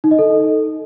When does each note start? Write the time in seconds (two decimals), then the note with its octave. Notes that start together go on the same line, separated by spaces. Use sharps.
0.04 D#4
0.11 D#5
0.19 A4